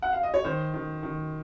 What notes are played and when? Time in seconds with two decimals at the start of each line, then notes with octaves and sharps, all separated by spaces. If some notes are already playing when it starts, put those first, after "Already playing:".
0.02 F#5
0.13 F5
0.23 D#5
0.34 C#5
0.44 D#3 C5
0.74 D#3
1.03 D#3